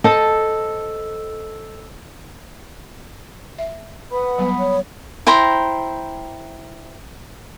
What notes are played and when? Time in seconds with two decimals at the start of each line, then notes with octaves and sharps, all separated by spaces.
0.04 A4 C5 D#5 A5
3.58 E5
4.11 B4 F#5 B5 D#6
4.38 F#3 G3 B3
4.59 C#5
5.27 E4 C5 G5 A#5